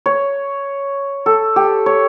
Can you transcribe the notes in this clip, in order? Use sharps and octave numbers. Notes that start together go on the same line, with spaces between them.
C#5
A4
G4
C#5